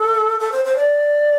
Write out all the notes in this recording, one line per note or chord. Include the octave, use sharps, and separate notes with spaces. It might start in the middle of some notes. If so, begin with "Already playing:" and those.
Already playing: A4
A4
C5
C5
D5